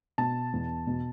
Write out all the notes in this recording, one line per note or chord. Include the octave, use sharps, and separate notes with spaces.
B2 A5
E2
B2